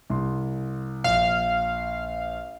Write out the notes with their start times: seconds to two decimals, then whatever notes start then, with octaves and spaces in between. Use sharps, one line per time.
0.10 C2 C6
1.04 A#1 F5